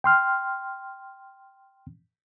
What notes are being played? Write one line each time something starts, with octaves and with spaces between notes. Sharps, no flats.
G5 C6 F6